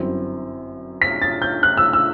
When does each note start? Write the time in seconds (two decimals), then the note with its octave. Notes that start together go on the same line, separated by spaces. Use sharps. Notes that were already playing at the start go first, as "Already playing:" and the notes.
Already playing: G1 F#2 F#3 C4 E4
1.02 B6
1.22 A6
1.42 G6
1.63 F#6
1.77 E6
1.93 E6